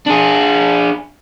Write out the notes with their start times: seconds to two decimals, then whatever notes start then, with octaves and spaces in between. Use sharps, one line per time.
0.06 D4 G#4